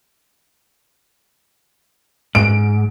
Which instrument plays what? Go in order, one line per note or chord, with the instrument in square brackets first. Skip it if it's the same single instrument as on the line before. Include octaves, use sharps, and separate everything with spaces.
[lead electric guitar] G#2 [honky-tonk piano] D7